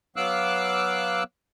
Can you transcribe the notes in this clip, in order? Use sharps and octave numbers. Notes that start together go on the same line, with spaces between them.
F#3 B3 F5 D6 E6 F#6